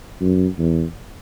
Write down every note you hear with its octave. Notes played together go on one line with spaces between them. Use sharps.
F#2
E2